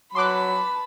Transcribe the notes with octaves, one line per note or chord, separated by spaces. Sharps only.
F#3 B4 A5 B5 C6 D6 F#6